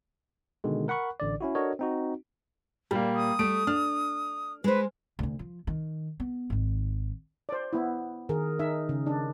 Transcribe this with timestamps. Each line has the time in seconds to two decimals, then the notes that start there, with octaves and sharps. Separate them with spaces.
0.64 B2 D3 D#3 G#3
0.88 A#4 F#5 B5 C#6 F#6
1.20 A1 D3 D5
1.41 C#4 E4 F#4
1.55 D4 F#4 A4 A#4 C#5 D#5
1.79 C4 D#4 F#4
2.91 A#2 G3 A#3
3.16 D#6
3.39 G3 A3 D7
3.67 D4 F6
4.64 G#3 B4 C5
5.19 D2 D3
5.39 F3
5.67 D#3
6.20 B3
6.50 G#1 D#3
7.49 C5 D5
7.73 B3 E4
8.29 D#3 G#4 A#4
8.59 D#4 E5
8.89 C#3
9.06 D4